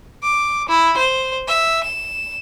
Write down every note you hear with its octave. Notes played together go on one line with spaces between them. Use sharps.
D6
E4
C5
E5
E7